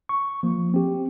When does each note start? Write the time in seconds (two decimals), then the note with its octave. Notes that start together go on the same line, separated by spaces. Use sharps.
0.09 C#6
0.43 F3 A#3
0.74 C4 G4